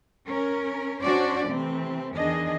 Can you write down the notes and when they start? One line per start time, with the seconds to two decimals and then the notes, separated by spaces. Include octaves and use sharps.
0.27 C#4 A#4
1.02 C#4 D4 F#4 C5 D5
1.48 C3 E3 A3 C4
2.15 E2 D#3 D4 G#4 D#5